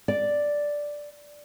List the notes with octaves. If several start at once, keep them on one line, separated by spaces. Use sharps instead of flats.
D5